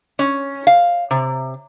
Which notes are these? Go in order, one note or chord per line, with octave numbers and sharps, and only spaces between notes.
C#4
F5
C3